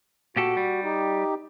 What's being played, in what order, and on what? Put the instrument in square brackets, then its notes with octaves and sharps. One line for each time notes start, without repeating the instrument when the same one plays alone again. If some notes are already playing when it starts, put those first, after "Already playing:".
[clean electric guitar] A#2 G4 A4 [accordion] F#4
[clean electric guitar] G3
[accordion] D#4 G4